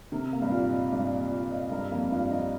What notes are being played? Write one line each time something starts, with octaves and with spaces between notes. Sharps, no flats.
C3 A#4
A#3
G2
A#2 F4
D#5
G2 A#4
A#3
F4
D#5
G2 A#4
F2 A#3
G2 F4
G2 D#5